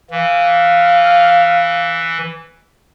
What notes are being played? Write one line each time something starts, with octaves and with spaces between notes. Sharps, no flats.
E3 F5